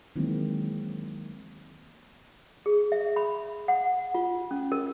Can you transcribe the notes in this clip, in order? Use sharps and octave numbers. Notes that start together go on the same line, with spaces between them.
D#3 E3 F#3 G#3 A#3 C4
G#4
E5
B5
F#5
F4
C#4
A#4